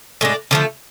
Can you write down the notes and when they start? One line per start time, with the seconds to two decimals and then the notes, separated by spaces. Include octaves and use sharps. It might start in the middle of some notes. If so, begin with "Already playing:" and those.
0.21 A2 G#3 D4
0.51 D3 F3 A3